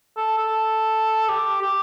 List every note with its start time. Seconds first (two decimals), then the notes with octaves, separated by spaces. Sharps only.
0.17 A4
0.38 A4
1.28 G4
1.62 G4